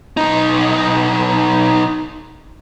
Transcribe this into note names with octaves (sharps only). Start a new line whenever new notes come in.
B1 D#4